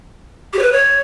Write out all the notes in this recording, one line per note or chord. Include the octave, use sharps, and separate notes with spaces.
G4
C#5
B4
C#5